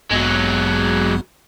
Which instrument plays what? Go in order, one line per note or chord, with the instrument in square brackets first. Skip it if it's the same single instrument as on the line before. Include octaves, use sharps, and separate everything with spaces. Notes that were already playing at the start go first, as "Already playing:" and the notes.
[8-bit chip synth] A1 G2 B3 [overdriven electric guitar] F#3 G#3